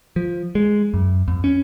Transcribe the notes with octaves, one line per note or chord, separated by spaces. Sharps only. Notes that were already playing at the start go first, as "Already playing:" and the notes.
F3
G#3
F#2
F2
C#4